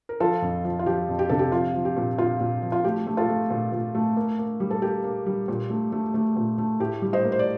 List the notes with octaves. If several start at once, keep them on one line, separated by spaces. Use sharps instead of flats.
A#4
F3 F4 A4
F2
F3
F4
F3 G4
F2
G4
C3 A4
G4
F3 F4
F3
G4
A#2
A#2 F4
A#2
F3
F4
A3 G4
A3
F4 A4
A3
A#2
A#2
A3
A#3
A#3
G3
A4
A#3 G4
A#3
G3
A#2
A3
A3
A3
A#2
A3
A2 G4
G3
C5 D#5
A#3
C5
D5